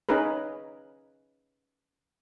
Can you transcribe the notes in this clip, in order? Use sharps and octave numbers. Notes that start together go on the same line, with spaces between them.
C#4 D#4 G#4 A#4 B4